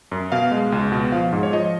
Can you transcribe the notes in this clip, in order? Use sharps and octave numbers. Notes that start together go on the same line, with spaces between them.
F#2
B2 F5
G#3
C#2
B2
F3 F5
G#2
C#5
F3 D#5